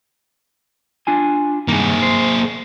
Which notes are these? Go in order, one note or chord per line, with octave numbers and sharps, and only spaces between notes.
D4 F4 G#5
G2 C3 D#3 A#3 G#4
C5